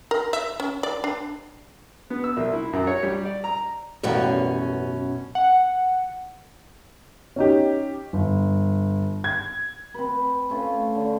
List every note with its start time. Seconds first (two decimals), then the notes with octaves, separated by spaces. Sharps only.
0.11 A#4
0.33 E5
0.60 C#4
0.83 D5
1.04 D4
2.10 B3
2.24 E6
2.37 C2
2.53 E4
2.73 F#2
2.87 C#5
3.03 G3
3.25 D5
3.44 A#5
4.03 A1 F#2 B2 G3 A#3 C#4
5.35 F#5
7.36 C#4 D#4 G4
8.13 G1
9.24 G#6
9.94 C4 B4
10.50 A3 C#4 F4
10.95 D3